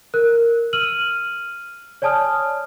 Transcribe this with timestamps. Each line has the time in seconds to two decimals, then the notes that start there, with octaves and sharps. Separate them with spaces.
0.14 A#4 F#6
0.73 E6 F6 D#7 F#7
2.02 C#5 D5 G#5 A5 D#6 F6